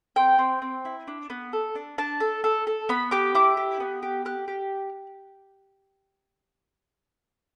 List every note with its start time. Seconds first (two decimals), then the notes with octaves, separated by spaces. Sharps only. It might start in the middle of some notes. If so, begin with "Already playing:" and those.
0.16 C4 G5
0.39 C4
0.62 C4
0.85 E4
1.08 D4
1.30 B3
1.53 A4
1.75 D4
1.98 D4 A5
2.20 A4
2.44 A4
2.67 A4
2.89 B3 B5
3.11 G4 D6
3.35 E4 D6
3.57 G4
3.80 B3
4.03 G4
4.25 G4 F#6
4.48 G4